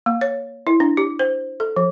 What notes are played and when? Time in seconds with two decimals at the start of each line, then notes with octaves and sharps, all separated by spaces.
0.06 A#3
0.21 C#5
0.67 E4
0.80 D4
0.97 G4
1.19 C5
1.60 A4
1.77 F3